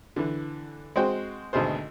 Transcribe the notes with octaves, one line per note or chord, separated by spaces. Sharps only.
D3 E3
G#3 C4 F#4 C5 G5
G#1 D2 B2 G#4 C5